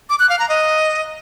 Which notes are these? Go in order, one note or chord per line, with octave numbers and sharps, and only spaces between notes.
D6
F#6
F5
A#5
D#5